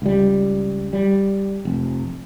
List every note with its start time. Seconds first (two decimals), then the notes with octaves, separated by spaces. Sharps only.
0.02 C#2 G3
0.93 G3
1.65 F1